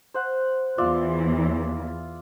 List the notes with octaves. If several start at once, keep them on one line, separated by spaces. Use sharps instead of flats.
C5 F#5
E2 E3 F4 D5 E5